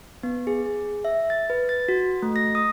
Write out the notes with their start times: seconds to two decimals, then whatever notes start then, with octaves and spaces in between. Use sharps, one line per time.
0.23 B3
0.47 G#4
0.66 G#4
1.05 E5
1.30 A6
1.50 B4
1.69 A6
1.88 F#4
2.23 A3
2.36 A#6
2.55 D#6